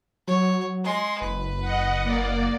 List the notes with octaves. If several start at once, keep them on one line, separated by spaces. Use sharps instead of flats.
F#3 C#5
G#3 C6
F#1 B4
D#5 F#5
A#3 D5